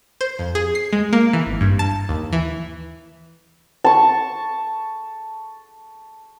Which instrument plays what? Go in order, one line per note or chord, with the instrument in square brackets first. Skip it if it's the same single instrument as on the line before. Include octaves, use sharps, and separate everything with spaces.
[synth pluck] C5
F2
G#4
C7
G#3
A#3
E3
G#1
G2
A5
D#2
E3
[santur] A5 C#6